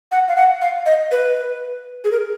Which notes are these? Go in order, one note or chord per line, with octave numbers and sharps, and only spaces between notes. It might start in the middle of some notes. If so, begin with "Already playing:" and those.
F#5
F5
F#5
F5
D#5
B4
G#4
A#4